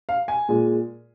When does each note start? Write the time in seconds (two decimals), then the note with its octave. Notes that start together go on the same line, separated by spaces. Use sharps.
0.09 F5
0.28 G#5
0.49 A#2 G#3